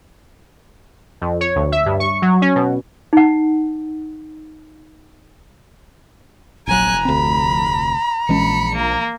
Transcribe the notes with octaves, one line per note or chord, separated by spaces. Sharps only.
F2
C#5
D2
E5
G2
C#6
F#3
C#4
B2
D#4 F#5
F1 A#1 F#3 G#5 A#5 F#6
D2 C4 B5
A#1 E3 G#3 C#4 B5 C#7
A#3